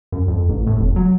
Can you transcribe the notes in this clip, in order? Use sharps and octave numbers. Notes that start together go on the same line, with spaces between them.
F#2
F2
A1
A2
F1
F#3